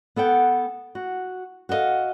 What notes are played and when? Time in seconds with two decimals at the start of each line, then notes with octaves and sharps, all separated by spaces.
0.16 B3 A4 F#5 G5
0.95 F#4
1.69 F#4 A4 B4 D#5 F5